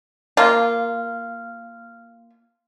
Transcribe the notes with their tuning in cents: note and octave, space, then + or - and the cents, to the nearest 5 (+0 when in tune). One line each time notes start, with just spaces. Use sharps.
A#3 +0 F4 -10